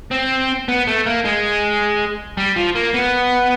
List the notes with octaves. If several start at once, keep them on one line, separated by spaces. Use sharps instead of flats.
C4
B3
A3
A#3
G#3
G3
F3
A#3
B3